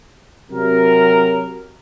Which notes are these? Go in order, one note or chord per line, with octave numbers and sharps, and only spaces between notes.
C3 F#3 A#4